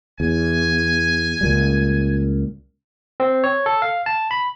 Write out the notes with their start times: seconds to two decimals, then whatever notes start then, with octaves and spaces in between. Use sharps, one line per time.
0.20 E2 G#5
1.41 C#2 A#2 G3
3.20 C4
3.44 C#5
3.66 A4
3.82 F5
4.06 A5
4.31 B5